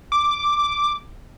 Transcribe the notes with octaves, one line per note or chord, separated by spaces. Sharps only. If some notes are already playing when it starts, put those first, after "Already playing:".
D6